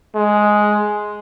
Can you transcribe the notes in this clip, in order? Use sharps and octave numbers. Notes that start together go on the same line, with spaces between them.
G#3